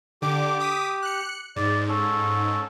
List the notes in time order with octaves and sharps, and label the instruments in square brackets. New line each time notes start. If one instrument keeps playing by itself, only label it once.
[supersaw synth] D3 D6 [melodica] G4
[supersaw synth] D6 D#6 B6
F#6 C#7
[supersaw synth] G#2 [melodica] D5
[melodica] C#4 A4